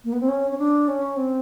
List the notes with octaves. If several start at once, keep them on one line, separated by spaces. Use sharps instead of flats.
A#3
B3
C4
C#4
C#4
D4
C#4
C4